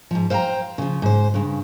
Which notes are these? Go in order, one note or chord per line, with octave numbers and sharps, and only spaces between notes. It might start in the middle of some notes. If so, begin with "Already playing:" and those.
G#2 F3
C5 F5 G5 A5 A#5
C#3 F3
G#2 C5
G2 C#3